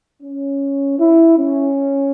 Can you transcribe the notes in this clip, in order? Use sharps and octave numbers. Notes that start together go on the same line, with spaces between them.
C#4
E4
C#4